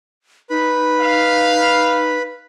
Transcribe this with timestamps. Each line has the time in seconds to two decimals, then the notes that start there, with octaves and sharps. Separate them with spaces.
0.50 D#4 B4 B5
1.00 F5